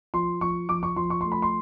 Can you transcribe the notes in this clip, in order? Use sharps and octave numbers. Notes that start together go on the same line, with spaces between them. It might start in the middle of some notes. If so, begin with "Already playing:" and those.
F3 C6
F3 C#6
F3 D6
C#6
F3 C6
C#6
A3 C6
B5
C6